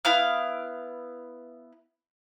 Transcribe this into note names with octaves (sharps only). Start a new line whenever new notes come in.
B3 E4 F5 F6